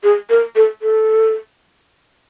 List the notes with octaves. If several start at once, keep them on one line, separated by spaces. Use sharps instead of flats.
G#4
A#4
A4
A4